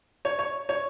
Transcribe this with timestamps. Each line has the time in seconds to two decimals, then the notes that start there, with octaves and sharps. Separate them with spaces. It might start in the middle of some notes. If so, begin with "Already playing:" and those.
0.25 C#5
0.39 C#5
0.69 C#5